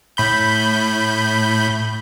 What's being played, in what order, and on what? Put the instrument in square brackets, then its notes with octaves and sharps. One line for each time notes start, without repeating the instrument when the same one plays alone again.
[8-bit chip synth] A2 B5 G6